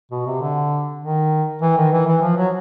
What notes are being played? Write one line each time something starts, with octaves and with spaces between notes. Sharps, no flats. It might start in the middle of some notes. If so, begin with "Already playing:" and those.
B2
C3
D3
D#3
E3
D#3
E3
E3
F3
F#3